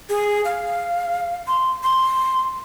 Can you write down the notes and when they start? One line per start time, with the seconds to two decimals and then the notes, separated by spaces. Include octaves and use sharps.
0.09 G#4
0.45 F5
1.47 C6
1.83 C6